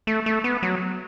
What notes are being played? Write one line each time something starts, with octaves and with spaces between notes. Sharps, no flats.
A3
A3
B3
F#3